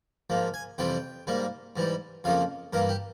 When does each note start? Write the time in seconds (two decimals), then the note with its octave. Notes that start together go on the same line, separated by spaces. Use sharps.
0.30 G#2 F3 A#3
0.54 G#5
0.78 F2 C3 E3 G3 G5
1.27 G#2 G3 A#3
1.76 G#2 E3 G3
2.24 F2 C#3 F3 A#3 F5
2.73 G2 E3 A#3 A#4
2.89 G4